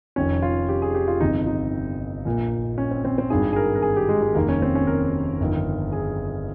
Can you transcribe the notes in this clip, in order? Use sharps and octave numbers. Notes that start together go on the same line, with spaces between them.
F1 F2 D#3 C#4
F4
G4
G#4
G4
F4
G1 F2 C3 D#3 D#4
D#4
A#1 A#2
C#4
C4
C4
C4
G#1 G2 D#3 G#4
G#4
A#4
A#4
G#4
G4
G#3
G#3
F1 D#2 D#3 A#3
C#4
C4
C#4
A#4
G1 F2 D#3
G#4